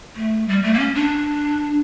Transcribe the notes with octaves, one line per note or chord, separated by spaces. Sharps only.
A3
G3
A3
A#3
C#4
D4